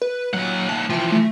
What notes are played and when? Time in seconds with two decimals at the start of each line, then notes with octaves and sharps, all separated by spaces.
0.02 B4
0.33 D#2 F#3 F#5
0.69 A5
0.90 E3 F3 G5
1.12 A3